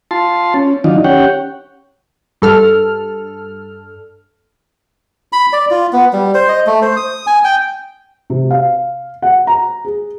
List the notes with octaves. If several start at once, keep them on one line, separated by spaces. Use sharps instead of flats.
F4 A5 C6
C#4
D#3 F#3 D4 D#4 F4
C#4 G4 C#5 F#5 G5
G2 A4 F6
B5
D5
F4
B3
G3
C5
D#5
A3
C5
D#6
G#5
G5
C3
F5
F#5
A#5
G#4